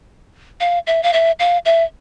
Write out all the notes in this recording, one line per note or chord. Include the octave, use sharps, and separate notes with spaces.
F5
E5
F5
E5
F5
E5